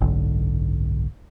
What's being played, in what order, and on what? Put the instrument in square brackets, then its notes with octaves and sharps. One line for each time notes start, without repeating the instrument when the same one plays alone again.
[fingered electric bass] F#1 B1 G#2 D3